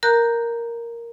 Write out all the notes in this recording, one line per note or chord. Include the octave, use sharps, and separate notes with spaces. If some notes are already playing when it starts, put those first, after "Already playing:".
A#4 A#5 F#6 G6